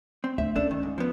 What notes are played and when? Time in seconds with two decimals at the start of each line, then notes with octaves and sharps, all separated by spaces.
0.24 C4
0.38 D2 E5
0.56 C#4 D4 A4
0.71 D#3
0.83 G#2
0.98 F3 B3